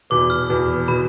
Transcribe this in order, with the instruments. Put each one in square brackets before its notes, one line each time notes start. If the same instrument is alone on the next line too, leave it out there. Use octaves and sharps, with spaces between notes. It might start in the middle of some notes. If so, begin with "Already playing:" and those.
[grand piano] E2 B2 B3 [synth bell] D6
[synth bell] F6
[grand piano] E2 B2 B3
[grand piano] B2 B3 [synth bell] B5